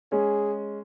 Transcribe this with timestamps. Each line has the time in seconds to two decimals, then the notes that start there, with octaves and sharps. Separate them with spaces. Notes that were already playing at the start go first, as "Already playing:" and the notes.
0.12 G#3 C#4 G#4